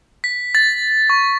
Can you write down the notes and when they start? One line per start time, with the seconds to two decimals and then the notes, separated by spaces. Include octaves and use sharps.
0.24 B6
0.55 A6
1.10 C#6